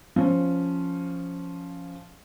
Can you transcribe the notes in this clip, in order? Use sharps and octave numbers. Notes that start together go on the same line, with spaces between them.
F3 C#4